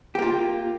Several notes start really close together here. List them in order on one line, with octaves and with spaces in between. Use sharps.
G4 A#3 F4